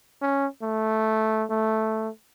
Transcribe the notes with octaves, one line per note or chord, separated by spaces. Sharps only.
C#4
A3
A3